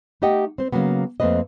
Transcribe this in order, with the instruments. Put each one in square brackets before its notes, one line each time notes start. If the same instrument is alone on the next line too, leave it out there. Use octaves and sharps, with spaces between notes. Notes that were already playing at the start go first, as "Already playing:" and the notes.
[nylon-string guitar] A3 D#4 G4 D#5 F#5 G5
C4 C5
C#3 F3 F#3 A#3 B3
F2 A3 A#3 C4 B4 D#5